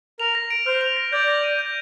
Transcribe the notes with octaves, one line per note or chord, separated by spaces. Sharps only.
A#4 F7
A#6
D7
C5 F6
F7
A#6
D5 G6
A#6
D#7
G6